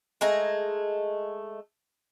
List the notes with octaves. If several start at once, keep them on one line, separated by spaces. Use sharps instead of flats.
G#3 A3 G#5 A#5